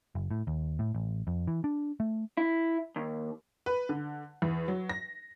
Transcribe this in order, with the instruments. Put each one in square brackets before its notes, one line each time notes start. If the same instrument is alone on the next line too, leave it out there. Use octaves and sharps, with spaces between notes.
[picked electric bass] F#1
A2
D#2
A2
A1
F2
E3
D4
A3
[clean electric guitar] E4
D#2
[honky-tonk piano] B4
D3
E2
F#3
A#6